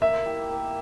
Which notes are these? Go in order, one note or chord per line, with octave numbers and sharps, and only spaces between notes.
A#3 E5
E4 G4
A#3